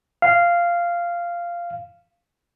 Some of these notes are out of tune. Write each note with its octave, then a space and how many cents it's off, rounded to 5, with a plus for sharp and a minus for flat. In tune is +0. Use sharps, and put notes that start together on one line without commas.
F5 -10